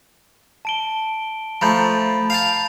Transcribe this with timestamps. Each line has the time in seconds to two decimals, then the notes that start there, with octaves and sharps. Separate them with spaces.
0.65 A5 D7 G7
1.61 F3 A3 A#5 B5 G6
2.30 F5 G5 A5 F7